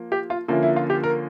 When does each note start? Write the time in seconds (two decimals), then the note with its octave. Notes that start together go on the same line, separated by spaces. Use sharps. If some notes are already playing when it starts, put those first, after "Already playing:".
Already playing: F3 A#3
0.12 G4
0.30 F4
0.48 D3 F3 A#3 C#4 E4
0.63 E4
0.76 F4
0.90 G4
1.04 A#4